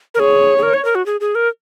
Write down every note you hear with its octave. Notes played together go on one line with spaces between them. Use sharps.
A#4
G#4 C#5
G#4
A#4
C#5
A#4
F#4
G#4
G#4
A#4